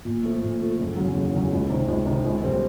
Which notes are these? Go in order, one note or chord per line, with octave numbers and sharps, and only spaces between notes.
A#2
F3 A3
A#2
F3 A3
F#1
E2 C#3 F#3
F#1
E2 C#3 F#3
C#2
C3 D#3
C#2
C3 D#3
C#2
B2 G3 C4